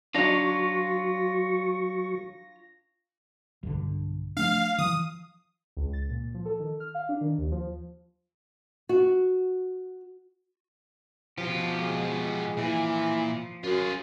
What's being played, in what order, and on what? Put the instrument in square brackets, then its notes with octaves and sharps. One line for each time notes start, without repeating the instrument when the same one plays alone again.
[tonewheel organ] F#3 C#6 [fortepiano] D4 D#4 D5 [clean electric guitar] F4 C#5 [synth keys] A#6
[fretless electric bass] B1 G2 D3
[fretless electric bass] F3 A3 D4 [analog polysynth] F5
[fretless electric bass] E3 F3 [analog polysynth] D#6
[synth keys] C#2
A6
A#2
F3
A4
D#3
F6
F5
D4
D#3
D#2
F3
[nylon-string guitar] F#4
[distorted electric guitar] B2 G4 [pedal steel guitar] F3
[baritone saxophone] G#3
[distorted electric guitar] A#2 [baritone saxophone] E3
[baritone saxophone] F#2 [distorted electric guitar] F4 G#4